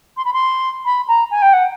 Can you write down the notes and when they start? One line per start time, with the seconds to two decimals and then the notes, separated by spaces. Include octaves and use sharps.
0.17 C6
0.25 B5
0.33 C6
0.85 B5
1.08 A#5
1.31 G#5
1.42 G5
1.53 F#5